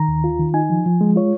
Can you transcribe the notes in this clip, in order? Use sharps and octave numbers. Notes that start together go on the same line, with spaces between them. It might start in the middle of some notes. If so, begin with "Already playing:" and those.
Already playing: D#3 A#5
D#2
F4
D#3
D#4 G#5
F3
F3
G#3
F4 C#5